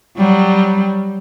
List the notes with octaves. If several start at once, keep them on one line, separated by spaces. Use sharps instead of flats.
F#3 G3